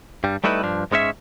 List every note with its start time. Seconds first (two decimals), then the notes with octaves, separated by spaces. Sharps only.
0.24 G2 G3
0.44 G3 A3 D#4 E4 B4
0.63 G2 F3 D4
0.92 G#2 G#3 C#4 C#5 E5